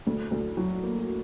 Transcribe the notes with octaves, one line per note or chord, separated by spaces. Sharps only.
D2
D2
F#3
A#3